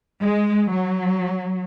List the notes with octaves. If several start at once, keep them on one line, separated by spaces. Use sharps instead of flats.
G#3
F#3